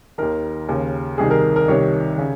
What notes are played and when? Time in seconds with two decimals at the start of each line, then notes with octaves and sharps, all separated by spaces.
0.18 D#2 D#3 A#4
0.69 D#2 C#3
1.18 C2 C3 D#3 G#4
1.31 A#4
1.56 A#4
1.68 C2 C3 D#3 C#5
2.18 C#3